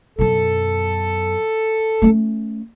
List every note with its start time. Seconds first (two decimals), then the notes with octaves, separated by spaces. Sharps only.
0.19 F#2 B2 A4
2.02 A3 C#4